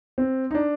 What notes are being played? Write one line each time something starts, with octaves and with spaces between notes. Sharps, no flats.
C4
D#4
D4